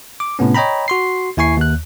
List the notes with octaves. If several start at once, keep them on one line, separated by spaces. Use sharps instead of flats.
D6
A2 C3 B3 C#4
C#5 D#5 G5 A#5 B5
F#4 C6 C7
D#2 E4 G#5 C#6 C7
D#2 F#6